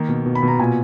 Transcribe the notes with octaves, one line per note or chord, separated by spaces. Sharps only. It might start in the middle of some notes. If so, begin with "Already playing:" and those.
Already playing: D#3 A#3
B2
B2
B5
B2
A#5
A#2 G#5